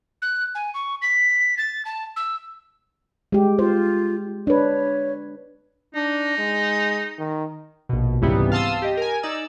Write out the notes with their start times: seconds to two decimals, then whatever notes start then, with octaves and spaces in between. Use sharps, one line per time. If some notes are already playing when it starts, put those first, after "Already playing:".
0.22 F#6
0.55 G#5
0.74 C#6
1.02 B6
1.58 A6
1.85 A5
2.16 E6
3.32 G#3 G4
3.59 F4 C5
4.47 D4 B4 C#5
5.95 D4 D#4
6.38 G#3
7.19 D#3
7.89 A#1 B2
8.21 C#2 G#2 C3 E3 G3 B3
8.52 F5 A5 C6 D#6 E6
8.82 G4 D#5
8.97 A#4 G#5
9.23 D#4 D5 E6